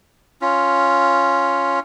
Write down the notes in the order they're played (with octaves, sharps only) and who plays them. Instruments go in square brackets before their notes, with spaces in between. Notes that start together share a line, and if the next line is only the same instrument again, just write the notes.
[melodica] C#4 F4